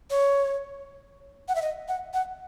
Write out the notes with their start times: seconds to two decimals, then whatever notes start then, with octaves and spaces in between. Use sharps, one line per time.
0.10 C#5
1.48 F#5
1.55 E5
1.62 D#5
1.88 F#5
2.14 F#5